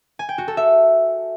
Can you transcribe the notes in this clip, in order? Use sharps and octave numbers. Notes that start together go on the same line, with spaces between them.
G#5
G5
F#4
A4
E5